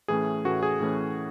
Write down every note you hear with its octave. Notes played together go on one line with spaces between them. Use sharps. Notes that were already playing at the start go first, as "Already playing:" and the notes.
A2 E3 A3 C#4 G#4
A2 E3 A3 C#4 F#4
G#4
A2 E3 A3 C#4